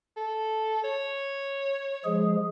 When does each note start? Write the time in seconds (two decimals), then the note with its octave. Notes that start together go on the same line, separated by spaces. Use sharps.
0.17 A4
0.84 C#5
2.05 F3 G#3 G#4